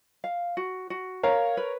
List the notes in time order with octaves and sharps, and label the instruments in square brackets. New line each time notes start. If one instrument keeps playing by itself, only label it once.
[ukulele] F5
F#4
F#4
[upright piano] A#4 C#5 [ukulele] F5
[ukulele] B4